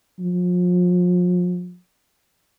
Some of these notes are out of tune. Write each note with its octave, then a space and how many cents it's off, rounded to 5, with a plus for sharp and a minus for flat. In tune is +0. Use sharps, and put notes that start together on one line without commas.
F3 +40